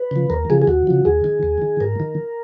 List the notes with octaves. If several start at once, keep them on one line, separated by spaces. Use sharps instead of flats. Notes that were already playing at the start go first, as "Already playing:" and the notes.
Already playing: B4
C#3 F3
D#2 A#4
C#3 F3 G#4
G#4
D#2 F#4
C#3 F3
D#2 G#4
D#3
D#2
D#3
G#2 A#4
D#3